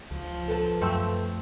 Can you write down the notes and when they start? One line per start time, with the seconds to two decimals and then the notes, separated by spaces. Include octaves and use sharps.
0.11 C#2 F3
0.48 A4 B4 A5
0.82 F#2 A3 C4